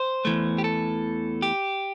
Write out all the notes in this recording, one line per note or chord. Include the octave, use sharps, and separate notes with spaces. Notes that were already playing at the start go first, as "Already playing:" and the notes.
Already playing: C5
E2 E3 A3
G4
A4
G4